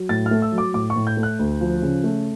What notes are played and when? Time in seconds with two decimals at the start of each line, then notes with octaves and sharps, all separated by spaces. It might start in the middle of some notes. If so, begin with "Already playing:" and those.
Already playing: F#3
0.09 A2 A6
0.26 F6
0.31 A3
0.42 E6
0.52 F#3
0.58 D6
0.74 A2 D6
0.90 C#6
0.96 A2
1.07 G6
1.17 A3
1.23 F#6
1.39 D2
1.61 F3
1.82 C#3
2.04 A3